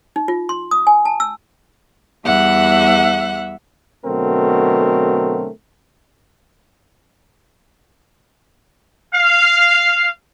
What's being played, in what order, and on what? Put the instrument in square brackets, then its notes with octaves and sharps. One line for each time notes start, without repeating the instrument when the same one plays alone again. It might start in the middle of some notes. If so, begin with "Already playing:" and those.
[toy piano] D#4
F4
C6
D#6
G#5
A5
E6
[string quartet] E2 G3 E5 F#5 F#6
[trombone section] B2 D3 F#3 A3 C4 A#4
[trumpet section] F5